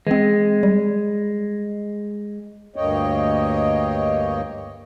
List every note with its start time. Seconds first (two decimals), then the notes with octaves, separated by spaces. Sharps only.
0.07 E3 G#3 C4
0.63 G3
2.76 D2 G2 A#3 C#5 D#5 G5